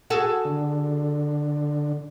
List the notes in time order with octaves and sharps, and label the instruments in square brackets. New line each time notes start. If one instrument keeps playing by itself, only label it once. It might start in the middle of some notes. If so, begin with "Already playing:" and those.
[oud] F#4 G#4 A4
[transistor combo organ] D3